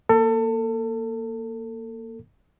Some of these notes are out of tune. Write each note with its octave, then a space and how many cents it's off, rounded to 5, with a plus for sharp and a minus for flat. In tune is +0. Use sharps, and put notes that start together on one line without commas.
A#3 +0 A4 +30